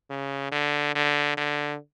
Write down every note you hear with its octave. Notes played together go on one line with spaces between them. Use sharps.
C#3
D3
D3
D3